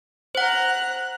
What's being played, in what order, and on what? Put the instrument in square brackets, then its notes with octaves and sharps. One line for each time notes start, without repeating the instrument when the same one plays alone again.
[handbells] C5 F#5 [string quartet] A#5 F#6